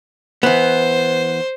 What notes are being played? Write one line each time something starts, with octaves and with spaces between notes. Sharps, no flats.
E3 B3 C5